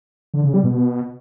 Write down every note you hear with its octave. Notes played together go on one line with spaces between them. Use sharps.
D3
C#3
G3
B2